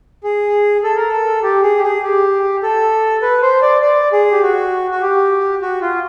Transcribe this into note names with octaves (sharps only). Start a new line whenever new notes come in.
G#4
A4
A#4
A4
G4
G#4
G4
G#4
G4
A4
B4
C5
D5
D5
G#4
G4
F#4
F#4
G4
F#4
F4